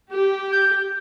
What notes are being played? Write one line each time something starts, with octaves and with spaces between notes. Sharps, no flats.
G4
G6